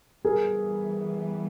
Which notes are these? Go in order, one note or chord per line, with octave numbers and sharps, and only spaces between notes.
E3 G3 B3 G#4 A#4